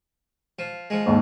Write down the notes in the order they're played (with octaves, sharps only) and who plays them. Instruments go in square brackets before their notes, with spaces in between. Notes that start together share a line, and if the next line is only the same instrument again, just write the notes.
[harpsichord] F3
F3 G#3
[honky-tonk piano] D#2 G#2